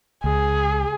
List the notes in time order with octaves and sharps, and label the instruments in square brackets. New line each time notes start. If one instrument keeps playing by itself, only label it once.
[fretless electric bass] C#2 [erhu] G#4